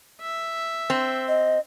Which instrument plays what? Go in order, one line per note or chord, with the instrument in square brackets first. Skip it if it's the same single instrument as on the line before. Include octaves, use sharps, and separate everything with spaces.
[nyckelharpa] E5
[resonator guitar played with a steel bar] C4
[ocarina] D#5